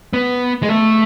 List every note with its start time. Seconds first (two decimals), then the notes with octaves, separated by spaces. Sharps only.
0.13 B3
0.63 G#3
0.69 A3